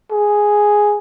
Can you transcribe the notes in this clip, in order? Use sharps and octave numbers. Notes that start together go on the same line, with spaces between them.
G#4